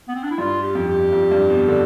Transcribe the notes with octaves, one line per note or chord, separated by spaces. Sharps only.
B3
C4
D4
E4
G2 F4
G4
F2
G4
F2
G2
B2
D3